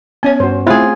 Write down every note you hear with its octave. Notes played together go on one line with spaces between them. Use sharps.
B3 C#4 C#5 G#5
G2 F#4 C5
A3 C4 E4 F4 G#4